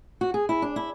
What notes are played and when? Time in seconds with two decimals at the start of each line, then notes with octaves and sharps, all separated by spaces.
0.21 F#4
0.34 G#4
0.49 E4
0.62 D4
0.76 E4